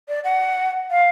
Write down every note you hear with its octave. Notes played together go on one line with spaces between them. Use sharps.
D5
F#5
F5